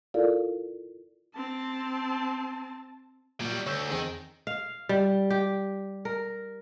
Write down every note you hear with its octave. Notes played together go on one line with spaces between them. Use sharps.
E4 F4 A4 A#4 D5 F5
C4 A5
A#2 F#3 G3
D2 C#5 E6 G6
E2 D#3 C4 D#4 G#4
F5
G3
G4
A#4